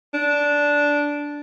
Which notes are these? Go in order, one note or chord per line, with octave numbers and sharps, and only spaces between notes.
D4